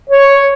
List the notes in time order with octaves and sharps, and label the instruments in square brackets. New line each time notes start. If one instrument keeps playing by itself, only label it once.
[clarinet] C#5